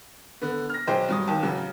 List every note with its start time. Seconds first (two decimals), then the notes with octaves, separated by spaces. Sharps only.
0.41 D3 B3
0.70 F6 A#6
0.87 B1 G#3 C5 G5
1.09 G2 F#3 D#6
1.27 D#2 D#3
1.43 A1 C#3 F#3